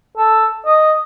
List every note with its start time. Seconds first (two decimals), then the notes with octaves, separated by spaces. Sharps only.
0.17 A4
0.66 D#5